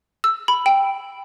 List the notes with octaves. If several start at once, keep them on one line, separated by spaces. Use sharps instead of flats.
E6
B5
G5